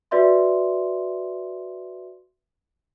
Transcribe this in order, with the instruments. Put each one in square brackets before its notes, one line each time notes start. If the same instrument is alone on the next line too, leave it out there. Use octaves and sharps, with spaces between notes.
[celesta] F#4 B4 D5 E5 C6